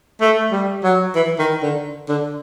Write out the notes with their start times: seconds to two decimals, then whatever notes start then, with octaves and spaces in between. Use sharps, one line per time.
0.21 A3
0.52 G3
0.84 F#3
1.15 E3
1.39 D#3
1.62 D3
2.09 D3